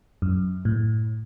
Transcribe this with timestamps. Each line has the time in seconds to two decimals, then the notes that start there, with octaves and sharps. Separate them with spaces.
0.22 F#2
0.65 A2